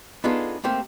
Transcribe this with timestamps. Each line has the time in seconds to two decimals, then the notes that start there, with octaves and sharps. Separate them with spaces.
0.24 B3 D4 D#4 F4 G#4 A4
0.64 A3 A#3 C4 G4